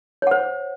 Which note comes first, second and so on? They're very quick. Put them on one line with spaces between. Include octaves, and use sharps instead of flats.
C#5 F#5 C5